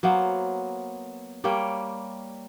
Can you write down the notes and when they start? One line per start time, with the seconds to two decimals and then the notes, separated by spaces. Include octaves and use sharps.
0.03 F#3 A#3 B3 C5
1.44 G3 A#3 C#5 G5